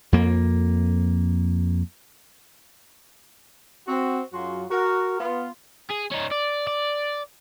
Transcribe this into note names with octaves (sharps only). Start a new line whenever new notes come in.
F2 A#3
C4 F#4
F#2 F#3 F4 F#4 G#4 C6
F#4 A#4
B3 F4
G#4
C#4 D#4
D5
D5